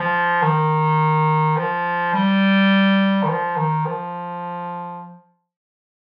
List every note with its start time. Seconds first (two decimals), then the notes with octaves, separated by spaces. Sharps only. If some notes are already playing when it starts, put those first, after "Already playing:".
Already playing: F3
0.42 D#3
1.57 F3
2.13 G3
3.23 D#3
3.29 F3
3.57 D#3
3.86 F3